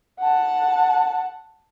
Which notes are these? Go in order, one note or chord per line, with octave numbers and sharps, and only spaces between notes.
F#5 A5